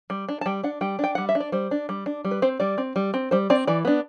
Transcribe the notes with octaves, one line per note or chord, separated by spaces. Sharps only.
G3
D4
A5
G3 G5
D4 F#5
G3 G5
D4 G5
G3 F#5
E5
D4
D5
G3 C5
D4
G3
D4
G3
B4
C4 C5
G3 D5
C4
G3
C4
G3 C5
C4 D5
E3 D5
B3 D4